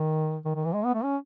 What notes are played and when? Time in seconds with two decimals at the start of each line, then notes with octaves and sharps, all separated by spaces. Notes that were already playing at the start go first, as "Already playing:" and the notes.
Already playing: D#3
0.45 D#3
0.55 D#3
0.65 E3
0.74 G#3
0.85 B3
0.94 A3
1.03 C#4